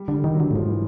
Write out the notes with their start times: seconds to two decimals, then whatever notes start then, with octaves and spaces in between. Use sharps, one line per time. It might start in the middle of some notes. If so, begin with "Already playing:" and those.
Already playing: G3
0.08 D3
0.14 G3
0.24 D#3
0.35 F#3
0.40 D3
0.51 A2
0.55 G#2 F3
0.69 E3